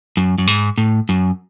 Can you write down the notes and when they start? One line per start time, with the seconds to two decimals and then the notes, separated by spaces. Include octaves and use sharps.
0.17 F#2
0.38 F#2
0.47 G#2
0.78 A2
1.09 F#2